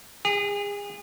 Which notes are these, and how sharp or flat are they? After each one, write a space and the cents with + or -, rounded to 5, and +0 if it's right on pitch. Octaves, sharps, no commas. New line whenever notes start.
G#4 -35